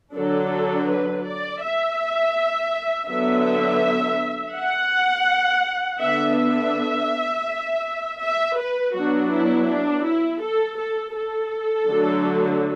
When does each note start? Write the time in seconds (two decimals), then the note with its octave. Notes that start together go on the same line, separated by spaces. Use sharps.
0.15 D3 F#3 D4 A4
0.89 B4
1.26 D5
1.63 E5
3.09 D3 F#3 B3 E5
4.56 F#5
6.02 D3 B3 D4 E5
6.39 E5
8.22 E5
8.59 B4
8.95 F#3 B3 D4 F#4
9.32 E4
9.69 D4
10.06 E4
10.42 A4
10.78 A4
11.16 A4
11.89 D3 F#3 A3 D4